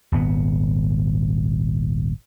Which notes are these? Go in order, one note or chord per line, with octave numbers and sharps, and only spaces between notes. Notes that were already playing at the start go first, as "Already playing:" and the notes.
D#1 G#1 B3